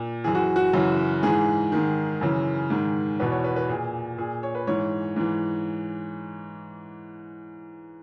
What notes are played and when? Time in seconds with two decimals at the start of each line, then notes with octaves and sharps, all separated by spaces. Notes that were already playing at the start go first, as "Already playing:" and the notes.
Already playing: A#2
0.24 F#2 E3 G#4
0.35 F#4
0.56 F#4
0.73 F#2 C#3 E3
1.23 G#2 E3 G#4
1.72 G#2 D#3
2.21 F#2 C#3 E3
2.70 G#2 D#3
3.20 E2 B2 B4
3.32 C#5
3.44 B4
3.56 B4
3.69 A#2 G#4
4.18 A#2 G#4
4.43 C#5
4.55 B4
4.67 G#2 E3 C#5
5.16 G#2 E3